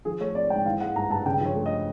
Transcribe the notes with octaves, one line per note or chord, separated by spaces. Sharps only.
F3 G#4
A3 C#5
C4 D5
G#2 G5
E3 F5
G#3 F#5
G2 A#5
G2 A5
C#3 G5
F3 C#5
A3
D#5